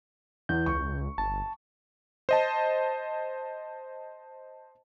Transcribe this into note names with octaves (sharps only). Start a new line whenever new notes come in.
E2 G6
C#2 C#6
G1 A5
C5 D#5 A5